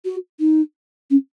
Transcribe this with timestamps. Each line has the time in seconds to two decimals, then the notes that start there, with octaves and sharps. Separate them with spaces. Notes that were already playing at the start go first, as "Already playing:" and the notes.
0.05 F#4
0.39 D#4
1.10 C#4